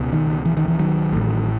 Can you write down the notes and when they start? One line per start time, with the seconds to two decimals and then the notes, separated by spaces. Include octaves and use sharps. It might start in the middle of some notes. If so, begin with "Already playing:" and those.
Already playing: C#2 B2
0.13 D#3
0.45 E3
0.57 D#3
0.68 E3
0.79 D#3 F#3
1.13 A1 A2